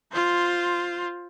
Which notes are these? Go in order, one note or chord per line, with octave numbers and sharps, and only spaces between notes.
F4 C5